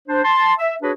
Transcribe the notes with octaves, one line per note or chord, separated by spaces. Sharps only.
D4 C5
A5 C6
E5
D4 F#4 G#4 B4 C#5